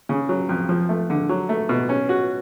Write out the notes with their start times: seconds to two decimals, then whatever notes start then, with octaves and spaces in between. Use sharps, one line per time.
0.09 C#3
0.29 F#3
0.49 F2
0.69 F3
0.89 A3
1.10 D3
1.29 F#3
1.49 A3
1.69 B2
1.89 C#4
2.09 F#4